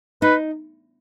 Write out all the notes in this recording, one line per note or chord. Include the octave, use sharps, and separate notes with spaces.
D#4 B4